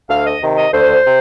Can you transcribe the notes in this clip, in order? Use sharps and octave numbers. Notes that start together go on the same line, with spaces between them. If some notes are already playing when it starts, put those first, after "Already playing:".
D2 F5
D#5
C3 D#3
D#5
D2 C5
C3